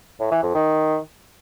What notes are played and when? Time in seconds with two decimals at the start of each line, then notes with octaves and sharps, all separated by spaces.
0.20 A2
0.31 E3
0.43 F2
0.54 D#3